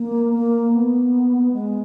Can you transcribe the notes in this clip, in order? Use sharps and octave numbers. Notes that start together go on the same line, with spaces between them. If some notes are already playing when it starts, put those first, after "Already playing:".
Already playing: A#3
A#3
B3
G#3